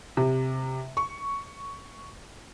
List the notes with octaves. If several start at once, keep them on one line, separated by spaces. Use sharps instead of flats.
C3
C#6